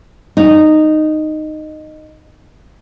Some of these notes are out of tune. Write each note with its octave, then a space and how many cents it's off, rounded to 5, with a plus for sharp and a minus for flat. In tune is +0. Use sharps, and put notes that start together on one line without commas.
D#4 -10